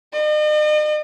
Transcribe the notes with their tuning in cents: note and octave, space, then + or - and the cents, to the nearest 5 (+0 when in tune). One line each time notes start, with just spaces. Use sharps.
D#5 -45